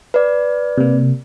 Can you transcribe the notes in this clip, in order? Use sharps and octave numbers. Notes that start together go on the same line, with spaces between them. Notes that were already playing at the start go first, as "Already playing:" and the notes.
B4 D5
C3 A#3